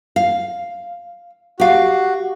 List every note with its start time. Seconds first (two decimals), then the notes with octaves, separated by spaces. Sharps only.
0.16 F5
1.60 F#4 G4 F5